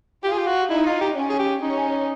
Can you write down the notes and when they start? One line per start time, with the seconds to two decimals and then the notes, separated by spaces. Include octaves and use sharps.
0.24 F4 G4
0.32 G#4
0.38 G4
0.47 F#4
0.70 D#4 E4
0.86 F4
1.01 G4
1.17 C#4
1.30 G#4
1.39 G4
1.62 C#4 D#4